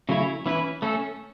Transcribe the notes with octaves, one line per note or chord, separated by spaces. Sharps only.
C#3 F#3 A3 E4 C#5
E3 C#4 E4 B4
A3 C#4 A4